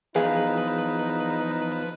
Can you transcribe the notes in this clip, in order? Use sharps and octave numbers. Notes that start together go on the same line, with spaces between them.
E2 F3 D#4 G#4 B4 F5